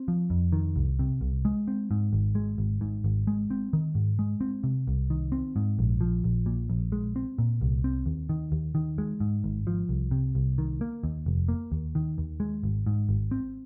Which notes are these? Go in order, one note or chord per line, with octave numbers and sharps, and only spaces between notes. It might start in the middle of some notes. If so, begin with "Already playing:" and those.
Already playing: C4
F3
F2
D#3
C2
C3
C2
G#3
C4
G#2
G#1
G#3
G#1
G#2
G#1
G#3
C4
D#3
G#2
G#3
C4
C3
C2
D#3
C4
G#2
A#1
F3
A#1
A#2
A#1
G#3
C4
A#2
C2
C4
D#2
D#3
D#2
D#3
G#3
G#2
G#1
F3
C2
C3
C2
D#3
A#3
D#2
F1
A#3
D#2
D#3
D#2
G#3
G#1
G#2
G#1
C4